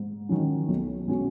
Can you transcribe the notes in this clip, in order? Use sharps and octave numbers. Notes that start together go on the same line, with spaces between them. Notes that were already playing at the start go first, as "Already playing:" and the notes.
Already playing: G#2
D#3 F#3 C#4
B1
B2 G#3 C#4 F#4